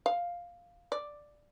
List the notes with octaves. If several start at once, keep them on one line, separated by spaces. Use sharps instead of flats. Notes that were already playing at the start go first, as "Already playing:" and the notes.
F5
D5